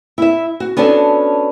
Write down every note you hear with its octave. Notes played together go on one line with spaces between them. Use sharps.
E4 E5
F#4
B3 C#4 D4 F#4 A4